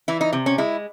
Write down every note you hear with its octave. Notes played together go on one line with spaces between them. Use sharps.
E3 E4
D#4
C3
C#4
G#3 E4